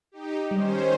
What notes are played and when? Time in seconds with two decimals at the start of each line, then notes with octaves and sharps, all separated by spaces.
0.12 D#4 G4
0.51 D#3 G3 C#4 C5